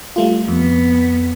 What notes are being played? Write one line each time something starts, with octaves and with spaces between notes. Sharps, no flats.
G3 A3 F4
F2 B3